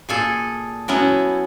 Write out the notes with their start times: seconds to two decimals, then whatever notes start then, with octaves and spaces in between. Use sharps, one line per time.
0.09 A#2 G#4 A4
0.88 F#3 B3 C#4 E4